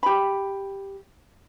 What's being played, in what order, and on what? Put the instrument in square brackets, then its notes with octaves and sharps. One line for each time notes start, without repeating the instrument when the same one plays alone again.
[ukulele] G4 B5